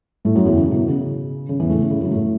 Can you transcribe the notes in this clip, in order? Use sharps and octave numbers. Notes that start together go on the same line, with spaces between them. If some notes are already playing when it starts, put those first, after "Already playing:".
A2 A3
F#2 F#3
E2 E3
C#3
B2
C#3
C#3
E2 E3
A2 A3
C#3
C#3
F#2 F#3
A2 A3